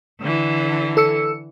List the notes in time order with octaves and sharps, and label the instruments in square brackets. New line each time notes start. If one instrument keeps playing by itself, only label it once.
[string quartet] D3 E3
[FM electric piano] A4 E6 C#7